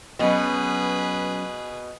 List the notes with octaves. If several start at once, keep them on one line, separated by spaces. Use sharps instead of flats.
B2 F#3 B3 C#4 G#4 B4